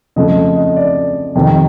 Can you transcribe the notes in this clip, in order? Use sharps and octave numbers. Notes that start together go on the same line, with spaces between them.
F2 C#3 F3 A3 D#5
D#5
D#5
D5
F2 C3 D#3